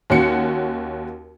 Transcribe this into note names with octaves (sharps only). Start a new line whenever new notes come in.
D#2 C#4 F#4 C#7